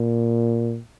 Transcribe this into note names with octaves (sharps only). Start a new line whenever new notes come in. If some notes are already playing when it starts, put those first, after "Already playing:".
Already playing: A#2